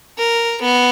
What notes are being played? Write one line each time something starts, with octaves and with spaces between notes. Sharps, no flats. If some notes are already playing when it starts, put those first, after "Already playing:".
A#4
B3